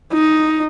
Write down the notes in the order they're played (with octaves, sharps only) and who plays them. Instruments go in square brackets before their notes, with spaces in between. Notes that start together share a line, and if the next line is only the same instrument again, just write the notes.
[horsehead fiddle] D#4